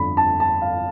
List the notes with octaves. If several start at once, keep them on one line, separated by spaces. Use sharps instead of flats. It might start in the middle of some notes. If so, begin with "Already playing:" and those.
Already playing: G1 F2 D3 B5
A5
A5
F5